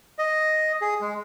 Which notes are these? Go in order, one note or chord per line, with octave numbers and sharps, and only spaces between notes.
D#5
G#4
G#3